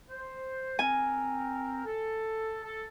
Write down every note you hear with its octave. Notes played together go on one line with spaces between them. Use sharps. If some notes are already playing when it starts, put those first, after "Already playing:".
C5
C4 A#4 G#5
A4
A4